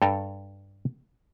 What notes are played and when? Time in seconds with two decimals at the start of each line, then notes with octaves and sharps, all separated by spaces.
0.02 G2 A4 G5 A#5